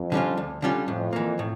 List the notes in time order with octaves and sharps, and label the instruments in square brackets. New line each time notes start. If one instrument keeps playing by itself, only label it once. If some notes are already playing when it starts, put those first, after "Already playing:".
Already playing: [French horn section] F2
[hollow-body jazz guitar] D3 G3 C#4 F4
D2
D3 G3 C#4 F4
[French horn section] F2 [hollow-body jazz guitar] A2
[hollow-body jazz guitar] E3 A#3
A2